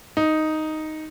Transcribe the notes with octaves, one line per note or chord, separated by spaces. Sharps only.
D#4